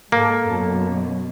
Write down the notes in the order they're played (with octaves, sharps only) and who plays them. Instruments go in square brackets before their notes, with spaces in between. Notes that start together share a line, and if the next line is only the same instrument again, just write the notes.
[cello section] G#2 G#3 A4 [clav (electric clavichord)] A#3
[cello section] F#2 B2